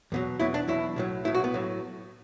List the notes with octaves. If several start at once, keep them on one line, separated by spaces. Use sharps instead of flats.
E2 B2 F#3
E2 B2 F#3 E4
D4
E2 B2 F#3 E4
B1 A2 F#3
B1 A2 F#3 E4
F#4
B3
A2 F#3